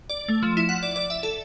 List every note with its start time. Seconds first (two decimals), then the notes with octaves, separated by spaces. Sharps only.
0.10 D5
0.28 A3
0.43 F3
0.57 E4
0.69 F#5
0.83 D5
0.96 D5
1.10 E5
1.23 A4